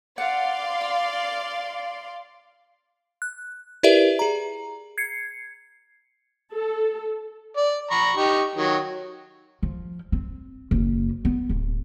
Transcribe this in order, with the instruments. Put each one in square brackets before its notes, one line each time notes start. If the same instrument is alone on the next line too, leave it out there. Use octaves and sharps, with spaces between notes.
[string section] D5 F5 C6 [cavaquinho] F#5
[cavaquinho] F4
[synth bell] F#6
E4 G4 A#4 B4 D5 E5
G#4 A#5
G#6 C7 C#7
[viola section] A4
[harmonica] D5
A#5 B5 C#6
D#4 G4 C#6
D#3 F#3
[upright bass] F3
C4
F#1
B3
D1